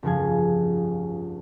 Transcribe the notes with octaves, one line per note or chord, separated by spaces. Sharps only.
F1 C#2 G2 F3 G#4 G#6